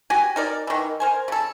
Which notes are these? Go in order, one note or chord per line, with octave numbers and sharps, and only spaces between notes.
F#4 G4 G#5
D#4 A#4 D5
D#3 E3
A#4 C5 G#5
C#3 A4